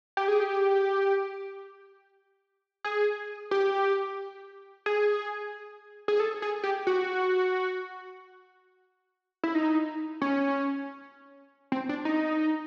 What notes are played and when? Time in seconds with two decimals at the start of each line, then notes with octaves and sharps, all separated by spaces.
0.17 G4
0.28 G#4
0.40 G4
2.84 G#4
3.51 G4
4.86 G#4
6.08 G#4
6.20 A4
6.42 G#4
6.64 G4
6.87 F#4
9.44 E4
9.55 D#4
10.22 C#4
11.72 C4
11.89 D4
12.05 D#4